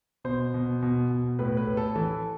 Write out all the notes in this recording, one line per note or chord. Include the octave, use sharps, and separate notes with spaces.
B2 C5
B2
B2
B2
A2 B4
B4
A2
A4
E3 A4